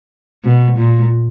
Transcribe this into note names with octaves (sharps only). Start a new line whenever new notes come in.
B2
A#2